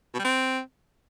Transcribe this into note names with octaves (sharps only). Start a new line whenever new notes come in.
B2
G3
C4